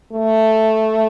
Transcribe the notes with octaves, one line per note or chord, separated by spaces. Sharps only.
A3